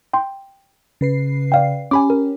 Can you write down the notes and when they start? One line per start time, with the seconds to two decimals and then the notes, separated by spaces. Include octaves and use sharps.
0.13 G5 C6
1.01 C#3 B4 C7
1.52 D5 F5 G5
1.91 C#4 G4 G#5 B5 D6
2.10 A#4